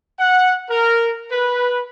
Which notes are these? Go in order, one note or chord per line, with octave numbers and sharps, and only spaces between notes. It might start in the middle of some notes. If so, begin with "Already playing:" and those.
F#5
A#4
B4